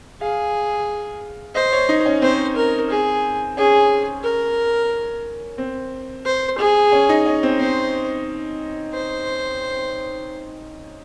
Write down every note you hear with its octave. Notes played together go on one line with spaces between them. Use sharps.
G#4 F5
C5 D#5
C#5
D#4
C#4
C4 C5
A#4
G#4
C#4 G#4
A#4
C4
C5
G#4
C#4
D#4
C#4
C4
C4 C5
C5